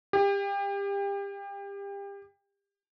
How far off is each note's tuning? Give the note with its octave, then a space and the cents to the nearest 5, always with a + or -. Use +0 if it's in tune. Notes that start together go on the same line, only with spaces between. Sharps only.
G4 +30